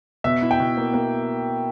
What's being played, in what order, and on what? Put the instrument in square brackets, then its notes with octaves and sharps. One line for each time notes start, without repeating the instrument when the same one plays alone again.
[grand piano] B2 [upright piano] E5
[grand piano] E4
[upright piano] G5
[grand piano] B2
A#3
A#3